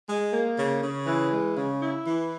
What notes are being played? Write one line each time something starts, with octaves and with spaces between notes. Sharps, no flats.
G#3
A#3
C#3
C#3
E3
G#3
C#3
E4
E3